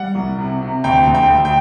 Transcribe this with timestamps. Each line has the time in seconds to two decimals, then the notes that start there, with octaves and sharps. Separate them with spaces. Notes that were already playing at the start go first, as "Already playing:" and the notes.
Already playing: G3 F#5
0.15 C2
0.38 C3
0.61 C3
0.84 D2 G5
1.07 D2
1.15 G5
1.30 D2
1.45 G5